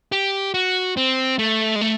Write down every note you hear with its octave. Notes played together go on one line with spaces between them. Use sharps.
G4
F#4
C4
A3
G#3
A3